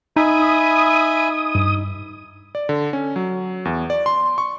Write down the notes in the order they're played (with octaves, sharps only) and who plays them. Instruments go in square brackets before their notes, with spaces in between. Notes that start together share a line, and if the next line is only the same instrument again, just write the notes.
[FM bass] D#4 [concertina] E5 G#5 B5 [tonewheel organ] D#6
[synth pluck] G2
[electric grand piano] D5
D3
C#4
F#3
E2
D5
C6
C#6